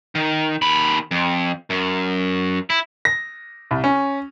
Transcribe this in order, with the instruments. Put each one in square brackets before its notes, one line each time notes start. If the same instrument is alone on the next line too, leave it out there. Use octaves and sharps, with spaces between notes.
[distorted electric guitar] D#3
D#2 B5
F2
F#2
E4
[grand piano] A#6
C2
C#4